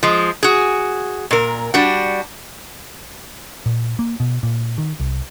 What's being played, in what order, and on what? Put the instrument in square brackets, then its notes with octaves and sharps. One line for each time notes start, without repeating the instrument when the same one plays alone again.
[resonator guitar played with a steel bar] F3 G#3
F#4 G#4
A#2 A#4
G3 D4 F#4
[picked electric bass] A#2
A#3
B2
A#2
D#3
C2